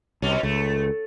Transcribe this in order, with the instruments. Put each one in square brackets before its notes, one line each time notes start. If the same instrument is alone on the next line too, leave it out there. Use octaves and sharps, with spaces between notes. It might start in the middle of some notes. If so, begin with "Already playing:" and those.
[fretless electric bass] C2 [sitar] B2 C#4
[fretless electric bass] C#2 [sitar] A3